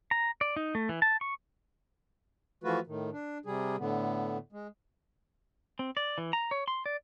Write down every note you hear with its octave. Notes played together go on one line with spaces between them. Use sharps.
A#5
D5
D#4
A3
E3
A5
C#6
E3 F3 A3 F4 F#4 B4
A2 D#3
D4
C3 G3 G#4
A2 D3 B3
G#3
C4
D5
E3
A#5
C#5
C6
D5